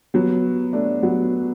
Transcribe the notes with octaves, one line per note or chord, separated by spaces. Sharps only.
F#3 B3
A3 D4
F#3 B3